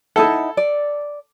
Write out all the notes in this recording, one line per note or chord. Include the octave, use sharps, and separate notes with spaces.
D#4 E4 A4 F#5
D5